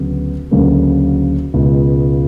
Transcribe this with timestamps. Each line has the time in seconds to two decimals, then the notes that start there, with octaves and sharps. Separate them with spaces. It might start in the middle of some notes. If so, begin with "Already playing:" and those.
Already playing: D2 C#3 F#3 B3
0.51 D2 C#3 F#3 A#3
1.54 C#2 B2 G#3